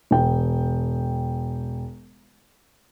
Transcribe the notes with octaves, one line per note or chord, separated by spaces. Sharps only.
E1 G5